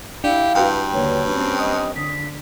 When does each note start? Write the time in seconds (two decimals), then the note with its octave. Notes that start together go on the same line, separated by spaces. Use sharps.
0.24 D4 E4 G4 F5
0.55 G2 F#4 B4 G5
0.94 D#2 D3 C#5
1.30 C4 C#4
1.59 D#5 D#6
1.95 D3 B6